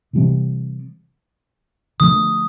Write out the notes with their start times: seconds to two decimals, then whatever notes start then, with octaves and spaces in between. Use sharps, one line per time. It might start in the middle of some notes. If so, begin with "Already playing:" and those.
0.13 C3 E3 G3 C4
2.00 D3 F3 A3 D#6